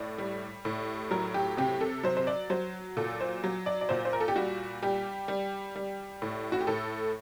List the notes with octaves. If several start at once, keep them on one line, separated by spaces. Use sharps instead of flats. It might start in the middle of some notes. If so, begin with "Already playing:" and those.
Already playing: A2 D5
G3
A2
F#3 A#4
G4
C3 G4
A4
F#3 C5
C5
D5
F#3 C5
A#2 A4
C5
F#3
D5
D5
A#2 C5
C5
A#4
A4
G4
G3 F#4
G3 G4
G3
G3
A2
F#4
G4
A2 A4